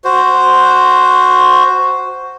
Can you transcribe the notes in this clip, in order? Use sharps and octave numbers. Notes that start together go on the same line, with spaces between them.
F#4 C5